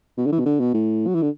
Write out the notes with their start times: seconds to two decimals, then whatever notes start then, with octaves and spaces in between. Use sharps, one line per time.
0.17 B2
0.26 D3
0.32 E3
0.40 B2
0.46 D3
0.60 B2
0.74 A2
1.07 F#3
1.15 E3
1.22 D3